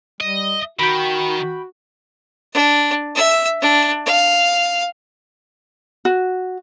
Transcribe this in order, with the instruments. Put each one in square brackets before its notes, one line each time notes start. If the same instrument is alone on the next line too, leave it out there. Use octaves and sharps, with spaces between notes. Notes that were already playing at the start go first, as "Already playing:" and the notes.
[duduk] G3 [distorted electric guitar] D#5
[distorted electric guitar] D#3 [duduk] F#4 [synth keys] G5 B5
[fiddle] D4
E5 E6
D4
F5
[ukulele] F#4